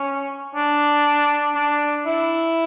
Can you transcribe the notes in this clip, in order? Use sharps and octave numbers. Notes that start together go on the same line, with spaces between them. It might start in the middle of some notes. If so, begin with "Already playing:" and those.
Already playing: C#4
D4
D4
E4